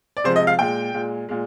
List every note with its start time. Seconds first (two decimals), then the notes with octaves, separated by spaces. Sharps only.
0.17 D5
0.24 C3 F3 G#3 C5
0.36 D#5
0.47 F5
0.59 A#2 G#3 G5
0.94 A#2 G#3
1.29 A#2 G#3